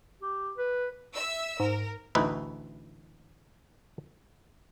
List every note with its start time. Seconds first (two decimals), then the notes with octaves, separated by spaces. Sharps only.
0.22 G4
0.57 B4
1.16 E5 E6
1.60 G#2 A#4
2.15 A1 D2 D#4 E4 B4